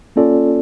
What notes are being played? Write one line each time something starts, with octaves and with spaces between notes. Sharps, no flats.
A#3 C#4 F4 A4 D5